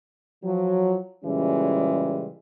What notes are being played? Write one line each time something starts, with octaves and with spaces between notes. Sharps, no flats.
F3 F#3
A#2 C#3 E3 G3 G#3 C#4